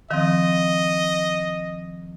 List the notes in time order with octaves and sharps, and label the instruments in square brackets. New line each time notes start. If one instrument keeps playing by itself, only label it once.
[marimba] D#3 F3 C4 [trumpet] D#5